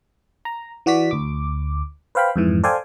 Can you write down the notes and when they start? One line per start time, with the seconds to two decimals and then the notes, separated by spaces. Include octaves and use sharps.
0.45 A#5
0.86 E3 F#4 D5 B6
1.11 D2 D6
2.15 B4 C5 F5 G5 B5
2.36 F2 G#2 E3
2.64 A4 C5 D5 F5 G5 G#5